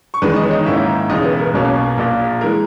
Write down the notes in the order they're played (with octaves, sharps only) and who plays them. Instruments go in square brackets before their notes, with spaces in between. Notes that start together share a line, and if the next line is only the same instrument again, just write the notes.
[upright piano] C#6
E2 D#3 G#3 B4 B5
D#4 D#5
C#5
D#4 D#5
G#2 D#3 A#3 C#4 E4 E5
E1 E2 C#3 D#4 D#5
B3 B4
A#4
B1 B2 A#3 C#4
A#1 A#2 A#3
E3 G#3 A#4